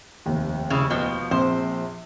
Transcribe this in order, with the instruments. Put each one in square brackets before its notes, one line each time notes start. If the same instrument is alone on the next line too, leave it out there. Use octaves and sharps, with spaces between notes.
[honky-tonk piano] F1 D#2
[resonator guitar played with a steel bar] C#3 E4
B2 F3
[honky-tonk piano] A#1 C4 [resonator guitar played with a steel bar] C5